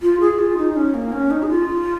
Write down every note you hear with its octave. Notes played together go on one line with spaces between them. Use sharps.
F4
G#4
F4
D#4
C#4
A#3
C#4
D#4
G#4
F4